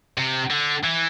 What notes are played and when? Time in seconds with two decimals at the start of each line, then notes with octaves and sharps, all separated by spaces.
0.18 C3
0.50 D3
0.84 E3